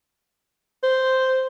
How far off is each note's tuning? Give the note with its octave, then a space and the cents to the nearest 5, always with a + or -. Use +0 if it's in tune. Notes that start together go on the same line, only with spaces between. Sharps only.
C5 -5